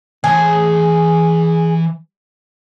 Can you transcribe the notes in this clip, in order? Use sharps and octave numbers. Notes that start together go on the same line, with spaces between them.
E3 G#4 A5